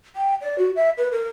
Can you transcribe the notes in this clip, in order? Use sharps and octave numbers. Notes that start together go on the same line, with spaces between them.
G5
D5
F#4
E5
B4
A#4